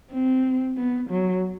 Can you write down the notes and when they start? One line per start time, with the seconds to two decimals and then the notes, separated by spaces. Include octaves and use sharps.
0.12 C4
0.77 B3
1.10 F#3